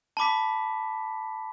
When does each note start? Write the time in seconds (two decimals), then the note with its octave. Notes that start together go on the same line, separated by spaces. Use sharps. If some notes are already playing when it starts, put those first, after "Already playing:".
0.17 A5 B5 D6 B6